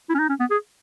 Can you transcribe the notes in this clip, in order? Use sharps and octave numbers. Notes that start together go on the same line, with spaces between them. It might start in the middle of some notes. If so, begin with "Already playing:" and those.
E4
C#4
D#4
C#4
B3
G#4